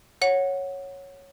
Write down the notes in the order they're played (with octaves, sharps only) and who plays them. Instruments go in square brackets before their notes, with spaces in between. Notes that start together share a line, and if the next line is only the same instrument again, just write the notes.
[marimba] C#5 F#5